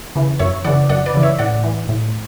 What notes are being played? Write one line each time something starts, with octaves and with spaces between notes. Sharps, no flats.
C#3 E3
F#2 C#5 E5
C#3 E3 D5 F#5
F#2 D5 F#5
B4 D5
C#3 E3
C#5 E5
A2 D5 F#5
E3
A2